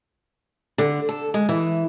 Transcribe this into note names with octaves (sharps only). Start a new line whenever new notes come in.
D3
A4
G#3
E3